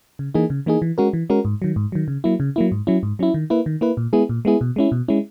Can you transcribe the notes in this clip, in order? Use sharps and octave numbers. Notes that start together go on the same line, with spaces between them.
C#3
E3 A#3 D#4 G#4
C#3
E3 A#3 D#4 G#4
E3
G#3 C#4 F#4 A#4
E3
G#3 C#4 F#4 A#4
G#2
D#3 F#3
G#2
D#3 F#3
C#3
F#3 A#3 E4
C#3
F#3 A#3 E4
G#2
F#3 C#4 E4
G#2
F#3 C#4 E4
D#3
A#3 E4 B4
D#3
A#3 E4 B4
A#2
G#3 B3 E4 G#4
A#2
G#3 B3 E4 G#4
B2
G#3 C#4 E4
B2
G#3 C#4 E4